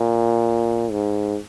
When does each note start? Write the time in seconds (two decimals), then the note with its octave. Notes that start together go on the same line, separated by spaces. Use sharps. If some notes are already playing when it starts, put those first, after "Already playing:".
Already playing: A#2
0.92 G#2